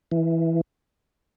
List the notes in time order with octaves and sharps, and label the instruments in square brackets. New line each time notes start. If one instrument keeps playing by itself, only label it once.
[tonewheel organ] E3